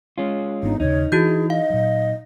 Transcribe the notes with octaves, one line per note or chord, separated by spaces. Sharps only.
G#3 C#4 F4
G#1 B3 D4 D#4
D#2 C#3 D#4 C#5
E3 E4 F#4 G#4 G6
D#5 F5
A#2 F#3